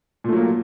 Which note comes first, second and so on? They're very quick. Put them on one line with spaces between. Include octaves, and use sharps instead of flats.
A#2 A3 F#3 A#3